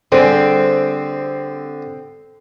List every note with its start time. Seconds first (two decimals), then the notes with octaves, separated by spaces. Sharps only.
0.12 D3 G3 C4 G#4 A4